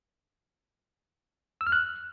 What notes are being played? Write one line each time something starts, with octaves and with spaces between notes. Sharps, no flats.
E6
F6
F#6